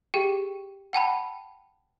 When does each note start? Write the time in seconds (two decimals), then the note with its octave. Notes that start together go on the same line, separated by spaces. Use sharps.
0.14 G4 G#4 G5
0.93 F#5 G5 A5 B5